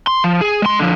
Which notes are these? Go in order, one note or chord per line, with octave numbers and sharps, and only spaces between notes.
C6
F3
G#4
G#3 C6
D3 F3